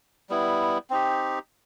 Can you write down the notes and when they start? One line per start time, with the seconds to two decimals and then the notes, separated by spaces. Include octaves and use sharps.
0.30 G3 B3 E4
0.90 C4 D#4 G4